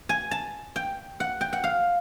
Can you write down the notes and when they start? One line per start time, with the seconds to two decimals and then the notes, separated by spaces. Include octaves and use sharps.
0.09 G#5
0.31 A5
0.76 G5
1.20 F#5
1.41 G5
1.53 F#5
1.64 F5